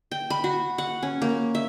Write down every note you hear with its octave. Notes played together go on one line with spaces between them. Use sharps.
G5
B5
F#4
F#5
C#4
A#3
E5